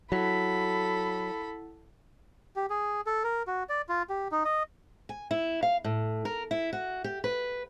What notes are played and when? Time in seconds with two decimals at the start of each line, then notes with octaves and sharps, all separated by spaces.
0.12 F#3 E4 A4 F#5 B5 B6
2.56 G4
2.70 G#4
3.06 A4
3.24 A#4
3.47 F#4
3.69 D5
3.89 F4
4.09 G4
4.32 D#4
4.45 D#5
5.09 G#5
5.31 E4
5.63 F5
5.84 A2
6.25 A#4
6.51 E4
6.73 F#4
7.04 G4
7.24 B4